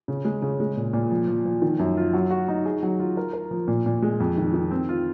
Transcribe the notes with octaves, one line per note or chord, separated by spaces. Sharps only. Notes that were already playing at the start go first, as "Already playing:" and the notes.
C#3
G#3
C#3
G#3
A#2
A#2
F3
F3
F3
D#3
F#2
F4
F#3
F#4
D#4
G#4
F#3
F4
A#4
A#4
F3
A#2
A#2
G#3
F2
D#3
D#3
C4
F4